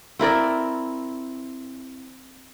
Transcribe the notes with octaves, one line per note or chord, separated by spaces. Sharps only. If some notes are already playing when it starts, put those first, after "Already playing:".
C4 E4 A#4 D5